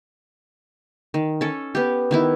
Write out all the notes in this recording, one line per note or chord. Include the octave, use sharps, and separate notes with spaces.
D#3
C#4 A4
B3 G4
D#3 B3 E4